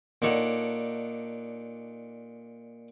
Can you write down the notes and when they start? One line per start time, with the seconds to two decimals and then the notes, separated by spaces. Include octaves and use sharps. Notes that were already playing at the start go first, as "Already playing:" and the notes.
0.22 A#2 D4 D#4 A4 C#5 F#5